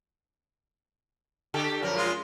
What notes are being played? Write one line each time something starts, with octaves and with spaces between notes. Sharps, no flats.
D3 G4 A4
F#2 F3 A#4
G#3 F4